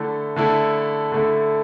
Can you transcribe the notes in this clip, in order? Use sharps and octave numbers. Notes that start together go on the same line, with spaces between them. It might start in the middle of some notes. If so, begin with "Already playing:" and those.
Already playing: D3 A3 E4
D3 A3 E4
D3 A3 E4